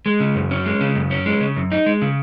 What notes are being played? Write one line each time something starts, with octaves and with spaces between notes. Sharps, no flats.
G#3
C#3
F#2
C#4
G#3
C#3
F#2
C#4
G#3
C#3
F#2
D#4
G#3
C#3